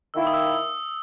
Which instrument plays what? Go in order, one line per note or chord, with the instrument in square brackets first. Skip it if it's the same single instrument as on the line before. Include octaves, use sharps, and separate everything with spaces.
[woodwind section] D#3 A#3 E4 [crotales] E6
[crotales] D#6
E6